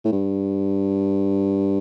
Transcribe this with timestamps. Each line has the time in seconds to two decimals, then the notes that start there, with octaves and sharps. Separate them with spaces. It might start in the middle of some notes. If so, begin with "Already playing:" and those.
0.05 A2
0.12 G2